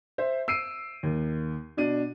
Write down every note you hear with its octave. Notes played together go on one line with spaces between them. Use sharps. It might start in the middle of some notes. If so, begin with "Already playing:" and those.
C5 E5
E6 C7 D7 D#7
D#2
B2 D4 D#7